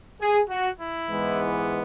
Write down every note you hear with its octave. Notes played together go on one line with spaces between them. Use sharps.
G#4
F#4
E4
G#2 E3 G#3 B3